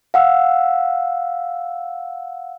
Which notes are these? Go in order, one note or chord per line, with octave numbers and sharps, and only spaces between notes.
F5 F#5 E6